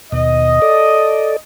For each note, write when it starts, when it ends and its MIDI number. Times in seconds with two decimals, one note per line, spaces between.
0.12 0.60 39
0.12 0.60 47
0.12 1.35 75
0.62 1.36 69
0.62 1.36 74